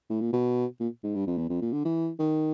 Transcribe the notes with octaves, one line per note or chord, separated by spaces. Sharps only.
A2
A#2
B2
A#2
G#2
G2
F2
E2
F2
A#2
D3
E3
D#3